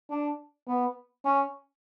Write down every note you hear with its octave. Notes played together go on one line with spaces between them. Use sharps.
D4
B3
C#4